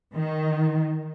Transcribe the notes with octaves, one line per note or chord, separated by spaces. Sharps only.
D#3